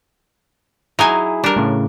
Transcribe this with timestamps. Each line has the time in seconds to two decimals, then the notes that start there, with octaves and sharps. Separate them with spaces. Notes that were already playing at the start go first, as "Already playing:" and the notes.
0.99 F#3 D#4 E4 G#4 G#5
1.44 G3 D4 A#4
1.56 A2 C#3